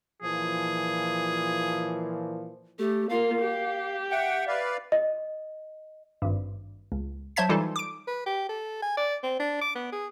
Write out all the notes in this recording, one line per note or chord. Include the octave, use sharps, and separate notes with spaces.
A#2 E3 F3 G#4
A3 G4
A#3 F4 F5
G4
E5 F#5 G5
B4 D5 F5
D#5
G#1 G2
C#2
F#3 C5 E5 A5 G#6 B6
E3 G3 D#4 F4 A4
D6 D7
B4
G4
A4
G#5
D5
C4
D4
D6
B3
G#4